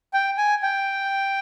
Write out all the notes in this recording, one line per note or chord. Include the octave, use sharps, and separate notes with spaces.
G5
G#5
G5